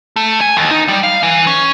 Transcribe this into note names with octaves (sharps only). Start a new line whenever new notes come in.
A3
G#5
D#2
D#4
G3
F5
E3
C#4